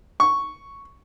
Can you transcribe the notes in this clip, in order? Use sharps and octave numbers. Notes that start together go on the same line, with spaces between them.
C#6